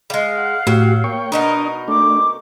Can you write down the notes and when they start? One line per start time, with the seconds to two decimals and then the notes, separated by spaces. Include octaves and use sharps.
0.10 G3 G#3 F5
0.38 F#5
0.67 A2 F#3 F#4 G4
1.04 A#3 C#5 G5 C#6
1.32 B2 D4 D#4 A#4 D#6
1.88 A3 D4 D6